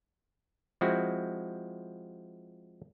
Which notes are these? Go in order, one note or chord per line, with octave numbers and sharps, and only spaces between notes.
F3 G#3 C4 E4 F#4